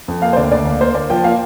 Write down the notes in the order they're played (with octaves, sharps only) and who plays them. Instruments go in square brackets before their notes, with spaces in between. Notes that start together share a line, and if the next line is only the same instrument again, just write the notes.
[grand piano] F2
A#3 F5
C5
D2 D5
D2 D5
A#3
A#3 C5
A#3 D5
F3 G5
A#3 F5